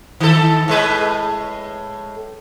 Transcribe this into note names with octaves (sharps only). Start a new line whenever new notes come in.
D#3 A4
A2 G#3 B4